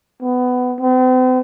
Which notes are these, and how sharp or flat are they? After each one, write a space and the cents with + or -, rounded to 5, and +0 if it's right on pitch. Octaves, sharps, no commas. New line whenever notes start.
B3 +20
C4 -45